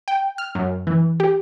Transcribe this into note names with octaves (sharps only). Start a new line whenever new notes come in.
G5
F6
F#2
E3
G4